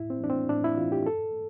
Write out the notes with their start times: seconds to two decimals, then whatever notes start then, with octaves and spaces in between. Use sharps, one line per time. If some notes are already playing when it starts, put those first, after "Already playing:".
Already playing: A2 E4
0.10 C4
0.20 E3 D4
0.30 C4
0.49 A2 D4
0.64 E4
0.78 E3 F4
0.92 G4
1.06 G2 A4